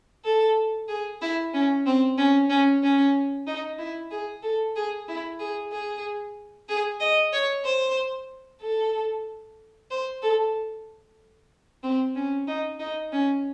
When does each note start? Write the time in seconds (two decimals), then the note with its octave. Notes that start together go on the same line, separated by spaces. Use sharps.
0.25 A4
0.89 G#4
1.22 E4
1.54 C#4
1.86 C4
2.18 C#4
2.50 C#4
2.83 C#4
3.47 D#4
3.79 E4
4.11 G#4
4.43 A4
4.76 G#4
5.08 E4
5.39 G#4
5.72 G#4
6.69 G#4
7.00 D#5
7.33 C#5
7.65 C5
8.62 A4
9.91 C5
10.22 A4
11.84 C4
12.16 C#4
12.48 D#4
12.79 D#4
13.13 C#4